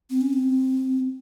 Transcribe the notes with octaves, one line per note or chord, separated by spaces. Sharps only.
C4
C#4
C4